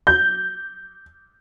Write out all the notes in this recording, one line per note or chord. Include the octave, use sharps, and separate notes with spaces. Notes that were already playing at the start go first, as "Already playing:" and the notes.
G6